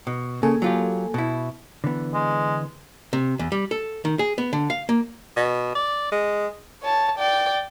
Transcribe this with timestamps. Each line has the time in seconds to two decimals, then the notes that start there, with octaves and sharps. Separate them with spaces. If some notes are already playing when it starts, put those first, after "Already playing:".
0.07 B2
0.43 C#3 A#3 A4 G#5
0.62 F#3 F4 G4
1.14 B2 E4
1.84 D3 E3 B3
2.14 G#3
3.13 C3
3.39 E2
3.52 G3
3.71 A4
4.05 D#3
4.19 G#4
4.38 B3
4.53 D3
4.70 F5
4.89 A#3
5.37 B2
5.75 D5
6.12 G#3
6.82 C#5 A5
7.18 D5 G5